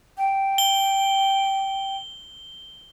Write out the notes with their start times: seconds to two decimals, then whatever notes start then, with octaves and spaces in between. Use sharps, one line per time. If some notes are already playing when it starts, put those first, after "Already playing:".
0.18 G5
0.58 G7